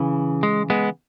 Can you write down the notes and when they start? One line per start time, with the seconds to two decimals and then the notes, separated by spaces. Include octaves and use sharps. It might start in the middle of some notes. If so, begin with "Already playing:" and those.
Already playing: C#3 E3
0.43 G#3
0.70 G#3 B3